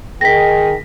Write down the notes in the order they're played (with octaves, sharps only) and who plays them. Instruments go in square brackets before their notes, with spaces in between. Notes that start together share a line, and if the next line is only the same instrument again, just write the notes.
[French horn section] D#3 G#4 [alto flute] G5 [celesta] A#6 B6